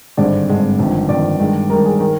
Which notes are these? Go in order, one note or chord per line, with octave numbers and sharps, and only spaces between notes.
G#1 G2 D3 G#3 C4 D5
G#1 G2 D3 G#3 C4
G1 F2 D#3
G1 F2 D#3 D5
G2 D#3 G#3
G2 D#3 G#3 A#4
G#4
D#3 A#4